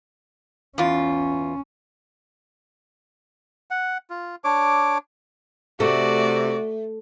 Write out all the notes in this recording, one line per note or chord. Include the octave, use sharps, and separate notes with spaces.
E2 C#4 F4
F#5
F4
D4 C#5 D6
C3 A3 F#4 D5